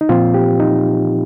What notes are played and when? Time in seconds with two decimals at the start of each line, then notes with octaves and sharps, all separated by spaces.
0.01 D#4
0.09 A#2 F3 C4 F4
0.34 G4
0.60 D#4